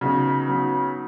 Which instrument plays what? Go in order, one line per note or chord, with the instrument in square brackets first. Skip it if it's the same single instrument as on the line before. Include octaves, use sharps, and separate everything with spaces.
[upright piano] C#3 [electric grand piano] F#3 B3 D#4
[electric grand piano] F#3 B3 D#4